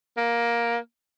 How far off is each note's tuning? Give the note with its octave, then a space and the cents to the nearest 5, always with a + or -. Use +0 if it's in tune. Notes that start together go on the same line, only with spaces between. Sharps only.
A#3 +10